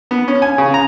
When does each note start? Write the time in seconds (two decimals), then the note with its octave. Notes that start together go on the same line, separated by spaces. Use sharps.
0.11 B3
0.28 C#4
0.42 G#5
0.58 C#3
0.74 A#5